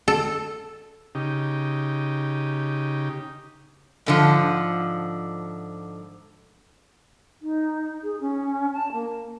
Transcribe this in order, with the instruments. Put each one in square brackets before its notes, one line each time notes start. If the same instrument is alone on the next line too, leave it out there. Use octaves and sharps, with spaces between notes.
[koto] A4
[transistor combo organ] C#3 D#4 G4
[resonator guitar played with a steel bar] G#2 D3 F3
[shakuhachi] D#4
G#4
C#4
A5
A#3